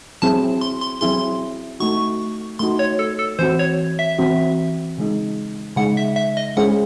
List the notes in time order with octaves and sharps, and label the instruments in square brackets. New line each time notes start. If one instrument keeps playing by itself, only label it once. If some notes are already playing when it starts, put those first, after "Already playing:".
[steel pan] F#3 C4 E4 G#4 [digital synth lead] A5
[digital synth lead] C6
C6
[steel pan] F#3 C4 E4 G#4 [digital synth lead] C6
[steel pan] A3 D#4 F#4 [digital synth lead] C#6
[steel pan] A3 D#4 F#4 [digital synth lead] C6
[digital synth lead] C#5
A4
A4
[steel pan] E3 C4 F#4 [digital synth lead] C5
[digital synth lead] C#5
E5
[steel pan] E3 C4 F#4
C#3 G#3 D#4
[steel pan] C#3 G#3 D#4 [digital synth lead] F#5
[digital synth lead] E5
E5
D#5
[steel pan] G#3 C#4 E4 G#4 C5 [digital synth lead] F#5